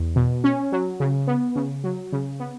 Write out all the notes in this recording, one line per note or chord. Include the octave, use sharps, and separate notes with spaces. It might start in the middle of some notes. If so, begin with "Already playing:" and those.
Already playing: E2
B2
C#4
F#3
C#3
B3
C#3
F#3
C#3
B3